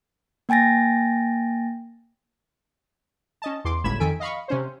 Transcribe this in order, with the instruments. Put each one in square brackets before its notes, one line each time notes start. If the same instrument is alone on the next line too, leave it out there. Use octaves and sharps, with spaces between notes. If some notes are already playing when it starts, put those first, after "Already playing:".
[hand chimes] A#3 G5 G#5 A6 A#6
[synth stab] C#4 D#5 A5
E2 C6 D6
G1 C#2 A2 B5 G#6 E7
F2 D#3 A4 G#5 B6 D7
D#5 F5 B5 C#6
C3 C#4 C5